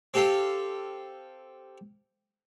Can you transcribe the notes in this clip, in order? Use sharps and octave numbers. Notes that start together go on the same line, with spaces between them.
C4 G4 A4 F5 G5